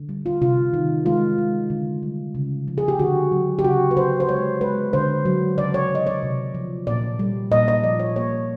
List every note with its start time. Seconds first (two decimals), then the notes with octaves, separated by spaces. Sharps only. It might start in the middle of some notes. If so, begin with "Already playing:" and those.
Already playing: D3
0.09 G3
0.26 F4
0.41 C3 F4
0.74 D#3
1.06 G#3 F4
1.38 G#3
1.70 D3
2.03 G3
2.35 C#3
2.68 F3
2.78 G#4
2.88 G4
2.99 D3 F#4
3.32 F#3
3.59 G4
3.64 C#3 F#4
3.91 B4
3.97 F#3 C5
4.20 C5
4.29 G#3 C#5
4.61 G#3 B4
4.93 D3 C5
5.26 F#3
5.58 C#3 D5
5.74 C#5
5.90 E3 D#5
6.07 D5
6.23 C3
6.54 F3
6.87 A#2 D5
7.19 G3
7.52 A#2 D#5
7.68 D#5
7.84 F3 D5
8.00 C#5
8.16 A#3 C#5